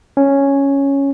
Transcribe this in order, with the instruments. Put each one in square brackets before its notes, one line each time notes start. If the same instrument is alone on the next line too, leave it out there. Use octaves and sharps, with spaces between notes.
[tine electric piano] C#4